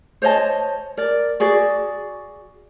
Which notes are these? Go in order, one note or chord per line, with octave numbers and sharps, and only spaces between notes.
C5 C#5 D#5 A5
A#4 D5
F#4 G#4 D5